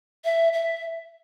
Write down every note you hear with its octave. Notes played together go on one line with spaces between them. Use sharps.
E5
E5